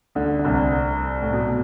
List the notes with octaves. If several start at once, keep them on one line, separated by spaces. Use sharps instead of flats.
D2 D3
D3
C2 C3
A2
B2
A2